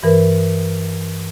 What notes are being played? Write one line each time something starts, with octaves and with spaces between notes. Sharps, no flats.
G2 E3 A#4 B4